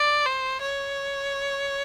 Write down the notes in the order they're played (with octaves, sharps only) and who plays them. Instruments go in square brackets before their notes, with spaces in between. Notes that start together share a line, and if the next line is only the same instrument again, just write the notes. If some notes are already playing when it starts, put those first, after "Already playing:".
Already playing: [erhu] D5
C5
C#5